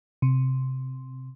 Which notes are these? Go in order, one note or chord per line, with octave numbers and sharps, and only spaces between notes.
C3